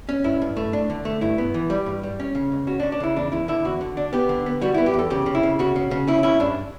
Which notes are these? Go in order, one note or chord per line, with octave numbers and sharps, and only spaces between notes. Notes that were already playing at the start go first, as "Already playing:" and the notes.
C#4
G2 E4
G2
A3
D4
D3
A3
G2 E4
B3
E3
G3
G2
G3
C#4
C#3
C#2
C#4 F#4
C#4 D4
D4
C#3 E4
E2 D4
E2 E4
D3 E4
E2 F#4
D3
D4
B3 G4
D3
B3
G3 F#4
B3 E4
G4
E2 A4
C#3 G4
C#3
E4
C#3
C#3 F#4
C#3
C#3
C#4 E4
C#4 E4
G2 D4